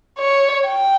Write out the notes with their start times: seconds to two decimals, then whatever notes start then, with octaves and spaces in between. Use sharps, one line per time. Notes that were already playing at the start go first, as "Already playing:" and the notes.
0.19 C#5
0.66 G5